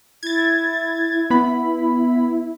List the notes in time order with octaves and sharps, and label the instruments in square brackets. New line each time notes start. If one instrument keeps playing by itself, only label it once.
[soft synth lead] E4 [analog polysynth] G#6 A6
[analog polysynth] B3 B5